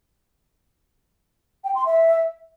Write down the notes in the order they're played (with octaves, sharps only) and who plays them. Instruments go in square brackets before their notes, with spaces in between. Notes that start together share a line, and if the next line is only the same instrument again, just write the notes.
[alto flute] G5
C6
E5